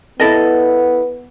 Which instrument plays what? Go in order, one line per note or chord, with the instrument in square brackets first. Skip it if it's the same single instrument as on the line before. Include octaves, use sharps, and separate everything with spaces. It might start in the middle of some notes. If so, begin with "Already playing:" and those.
[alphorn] B3 [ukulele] E4 A4 D#5